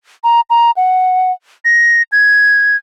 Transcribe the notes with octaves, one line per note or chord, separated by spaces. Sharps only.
A#5
A#5
F#5
A#6
G#6